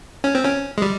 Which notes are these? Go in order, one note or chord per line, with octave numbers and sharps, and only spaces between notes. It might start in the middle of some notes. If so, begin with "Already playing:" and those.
C#4
C4
C#4
G#3
G3